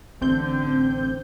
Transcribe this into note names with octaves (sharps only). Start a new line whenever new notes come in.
A1 D3 C4 G6